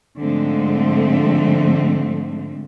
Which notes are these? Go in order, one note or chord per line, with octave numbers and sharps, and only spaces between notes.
G#2 D3 F3 G#3 A3 C4